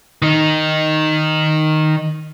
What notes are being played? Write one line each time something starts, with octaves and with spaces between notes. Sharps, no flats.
D#3 D#4